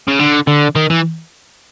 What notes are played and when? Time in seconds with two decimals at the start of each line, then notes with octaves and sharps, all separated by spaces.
0.08 C#3
0.19 D3
0.47 D3
0.76 D#3
0.90 E3